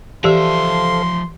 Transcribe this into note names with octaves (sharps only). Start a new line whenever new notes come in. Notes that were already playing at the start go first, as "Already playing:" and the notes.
E3 F3 G4 A4 C5 E5 F5 C6